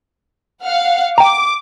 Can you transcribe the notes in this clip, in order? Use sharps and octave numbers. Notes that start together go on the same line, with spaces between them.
F5 F#5
G5 A#5 D6